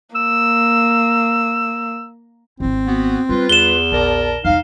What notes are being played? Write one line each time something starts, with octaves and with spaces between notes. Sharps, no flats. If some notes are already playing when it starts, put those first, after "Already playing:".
A#3 E6
G#1 C4 E4
B3 F#4
G3 F4 B4
E2 E7 G7
A#1 A#4 D5 A5
E2 C3 D#4 F5